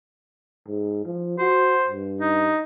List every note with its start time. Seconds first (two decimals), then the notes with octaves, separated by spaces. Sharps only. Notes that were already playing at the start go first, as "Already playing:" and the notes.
0.67 G#2
1.05 F3
1.38 F#4 C5
1.88 G2
2.20 D#4